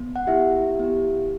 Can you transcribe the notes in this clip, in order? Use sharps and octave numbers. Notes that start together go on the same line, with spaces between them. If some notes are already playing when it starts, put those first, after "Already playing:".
Already playing: B3
F#5
B3 E4 G4 E5
B3 E4 G4